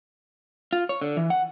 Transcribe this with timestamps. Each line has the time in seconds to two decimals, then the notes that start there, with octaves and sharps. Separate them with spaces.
0.73 F4
0.89 C#5
1.01 D3
1.17 E3
1.30 F#5